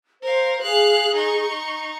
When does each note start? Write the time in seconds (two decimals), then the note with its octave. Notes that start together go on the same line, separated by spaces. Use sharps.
0.23 A#4 C5 F5
0.62 G#4 F5 F#6
1.15 D#4 C#6